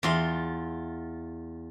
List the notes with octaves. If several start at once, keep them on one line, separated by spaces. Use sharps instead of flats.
E2 F4 C6